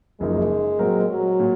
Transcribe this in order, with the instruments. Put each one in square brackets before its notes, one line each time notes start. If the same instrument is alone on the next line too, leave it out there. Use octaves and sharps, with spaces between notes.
[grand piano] F#1 F#2 F3 A#3 D#4 [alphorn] G#3
[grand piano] A#2 F#3 C4 F#4 A#4
[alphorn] F#3
[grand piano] A#2